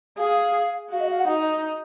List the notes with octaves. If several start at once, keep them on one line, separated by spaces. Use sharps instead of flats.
G#4 F5
F#4 F5
D#5
F5
F#5
D#4 D#5